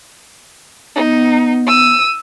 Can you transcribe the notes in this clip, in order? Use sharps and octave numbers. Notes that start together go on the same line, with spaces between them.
B3 D#4
E6 D#7